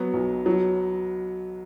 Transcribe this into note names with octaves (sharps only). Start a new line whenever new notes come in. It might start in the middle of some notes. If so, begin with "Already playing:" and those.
Already playing: F#3 B3
B1
F#3